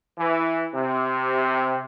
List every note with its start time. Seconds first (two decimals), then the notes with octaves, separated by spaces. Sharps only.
0.19 E3
0.75 C3